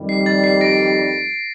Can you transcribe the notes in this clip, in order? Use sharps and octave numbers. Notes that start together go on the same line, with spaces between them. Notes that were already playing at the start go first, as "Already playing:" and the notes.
Already playing: F2 D#3 G3
C7
A6
C7
A#6 D7